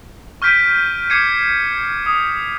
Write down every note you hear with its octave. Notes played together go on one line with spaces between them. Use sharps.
C#6 F6 G6 B6 D7 D#7
D6 G#6 C7 C#7 D#7
D#6